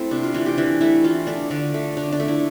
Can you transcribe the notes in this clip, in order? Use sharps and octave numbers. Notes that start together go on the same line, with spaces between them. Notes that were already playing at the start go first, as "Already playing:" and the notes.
Already playing: A3 C4 E4
C3 D4
F4
E3 A3 F4
G4
E3 D4
A3 E4
E3 F4
A3 D4
D3 D4
A3
D3 D4
D4
A3
E4